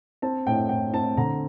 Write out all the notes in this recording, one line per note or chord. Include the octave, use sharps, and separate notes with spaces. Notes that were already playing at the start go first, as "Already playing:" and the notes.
C4 A5
A2 G5
A2 G5
C4 A5
D3 A#5